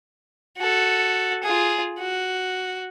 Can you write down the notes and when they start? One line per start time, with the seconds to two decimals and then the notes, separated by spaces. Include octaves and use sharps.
0.57 F#4 A4
1.43 F4 G#4
1.99 F#4